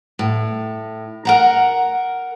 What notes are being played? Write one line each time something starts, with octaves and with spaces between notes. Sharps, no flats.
A2
A#4 F#5 A#5